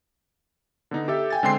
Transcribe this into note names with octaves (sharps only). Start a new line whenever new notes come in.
D3 B3 D#4
G4 A4 E5
G5 G#5 A6
D3 G#3 C4 G5 C6 C7